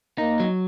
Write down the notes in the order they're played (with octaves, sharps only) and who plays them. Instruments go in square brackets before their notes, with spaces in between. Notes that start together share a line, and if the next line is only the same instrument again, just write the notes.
[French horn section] A#3 [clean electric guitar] D#4
[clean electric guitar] F#3